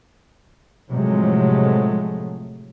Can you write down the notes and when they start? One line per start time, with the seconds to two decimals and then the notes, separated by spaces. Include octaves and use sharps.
0.92 A2 C3 F3 F#3 G#3 A3